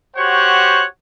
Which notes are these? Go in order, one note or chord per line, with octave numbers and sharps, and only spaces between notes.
F#4 G4 C5 C#5 F#5